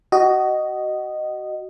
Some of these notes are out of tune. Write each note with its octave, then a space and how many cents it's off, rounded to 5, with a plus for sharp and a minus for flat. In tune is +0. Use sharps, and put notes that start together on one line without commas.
F#4 +25 D#5 -10